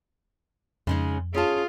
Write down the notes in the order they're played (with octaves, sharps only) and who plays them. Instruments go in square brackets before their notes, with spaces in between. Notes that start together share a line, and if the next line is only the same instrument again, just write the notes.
[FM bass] F2 [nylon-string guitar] C#3 G#3 D#4
[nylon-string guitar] C#4 A5 [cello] F4 [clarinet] G#4